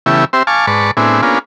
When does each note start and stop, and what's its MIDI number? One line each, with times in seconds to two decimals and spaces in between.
0.06 0.25 49
0.06 0.25 52
0.06 0.25 57
0.06 0.25 59
0.06 0.25 64
0.06 0.25 67
0.33 0.43 60
0.33 0.43 67
0.33 0.43 72
0.33 0.43 76
0.47 0.66 77
0.47 0.66 80
0.47 0.66 81
0.47 0.66 85
0.47 0.66 86
0.67 0.91 44
0.67 0.91 71
0.67 0.91 74
0.67 0.91 81
0.67 0.91 85
0.97 1.21 45
0.97 1.21 59
0.97 1.21 60
0.97 1.21 62
0.97 1.21 64
0.97 1.21 68
1.22 1.39 58
1.22 1.39 59
1.22 1.39 61
1.22 1.39 62
1.22 1.39 65
1.22 1.39 68